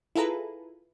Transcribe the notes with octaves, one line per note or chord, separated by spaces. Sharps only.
E4 F4 G#4 A4 B4 A#5